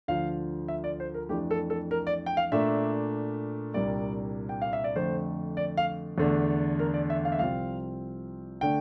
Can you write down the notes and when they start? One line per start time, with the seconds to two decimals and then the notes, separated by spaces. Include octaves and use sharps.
0.08 D2 D3 F3 F5
0.68 E5
0.84 D5
1.00 C5
1.14 A#4
1.29 F2 E3 A3 D4 G4
1.51 A4
1.70 A4
1.91 A#4
2.07 D5
2.26 G5
2.37 F5
2.52 A#2 A3 D4 E5
3.74 C2 A#2 G3 A#3 D4 D5
4.49 G5
4.62 F5
4.73 E5
4.84 D5
4.96 F2 D3 A3 C5
5.57 D5
5.77 F5
6.18 E2 D3 A3 D4
6.79 A#4
6.94 D5
7.10 E5
7.25 F5
7.32 E5
7.39 C2 C3 F3 C4 F5
8.61 D3 A3 D4 G5